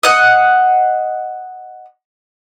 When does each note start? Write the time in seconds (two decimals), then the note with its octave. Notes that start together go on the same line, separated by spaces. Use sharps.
0.03 D#5 F#5